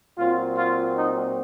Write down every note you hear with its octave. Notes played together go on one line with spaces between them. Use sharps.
A#2 F#3 C4 F4
F4
D#4